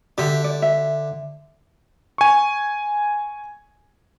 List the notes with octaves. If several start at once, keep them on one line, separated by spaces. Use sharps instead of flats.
D3 G4 E5
D5
E5
G#5 C#6